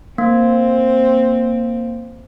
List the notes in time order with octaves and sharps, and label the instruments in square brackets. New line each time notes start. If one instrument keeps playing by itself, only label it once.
[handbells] A#3 [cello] C4